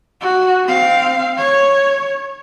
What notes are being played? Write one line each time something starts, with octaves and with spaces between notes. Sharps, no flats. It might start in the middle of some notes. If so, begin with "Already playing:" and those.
F#4
C4 F5
C#5